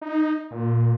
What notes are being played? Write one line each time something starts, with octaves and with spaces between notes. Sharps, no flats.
D#4
A#2